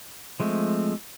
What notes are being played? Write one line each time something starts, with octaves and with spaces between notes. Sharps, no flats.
F3 G#3 A3 C4